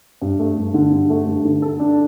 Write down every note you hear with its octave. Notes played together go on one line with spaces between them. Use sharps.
G2
A3
G2
D3
G2
A3
G2
D3
A4
D4